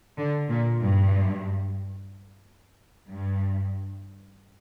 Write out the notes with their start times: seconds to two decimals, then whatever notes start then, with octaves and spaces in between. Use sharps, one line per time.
0.17 D3
0.50 A#2
0.82 G2
3.10 G2